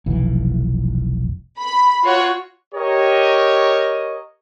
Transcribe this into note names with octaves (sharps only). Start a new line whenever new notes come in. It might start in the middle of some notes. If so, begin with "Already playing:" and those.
F1 B1 E3
B5
F4 F#4 C#5 F#5
G4 A#4 C#5 D#5